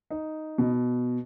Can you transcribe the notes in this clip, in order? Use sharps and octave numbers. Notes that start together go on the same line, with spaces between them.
D#4
B2